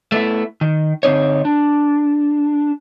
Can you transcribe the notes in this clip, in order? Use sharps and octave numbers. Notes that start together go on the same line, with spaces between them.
A3 B3 E4
D#3
D3 C4 D#4 C#5
D4